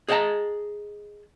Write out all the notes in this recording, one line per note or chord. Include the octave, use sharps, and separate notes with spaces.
G#4 C#5 D#5 F#5 A5 A#5